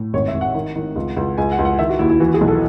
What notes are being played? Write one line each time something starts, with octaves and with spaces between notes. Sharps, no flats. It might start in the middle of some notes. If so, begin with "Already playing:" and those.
Already playing: A2
G#1 C#5
E5
G#1
F#5
D#3
D#3
C#2
C#2
C#2 G#5
F#5
C#2
F#5
D#3 E5
F#4
D#2 E4
E4
E3 F#4
G#4
B1
A4